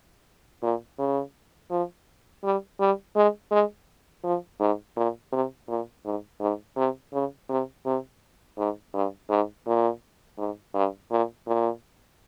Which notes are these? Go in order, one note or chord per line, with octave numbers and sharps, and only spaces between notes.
A#2
C#3
F3
G3
G3
G#3
G#3
F3
G#2
A#2
C3
A#2
G#2
G#2
C3
C#3
C3
C3
G#2
G2
G#2
A#2
G#2
G2
A#2
A#2